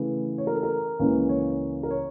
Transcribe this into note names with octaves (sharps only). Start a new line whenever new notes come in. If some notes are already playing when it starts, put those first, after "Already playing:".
Already playing: C#3 E3 A3
C#5
A#4
A4
A#4
C#2 C#3 E3 A#3 C#4
C#5
A#4
C#5